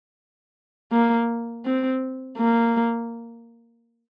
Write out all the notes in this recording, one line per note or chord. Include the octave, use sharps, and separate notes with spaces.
A#3
C4
A#3